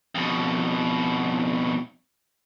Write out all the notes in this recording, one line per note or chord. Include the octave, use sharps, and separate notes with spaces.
F2 B2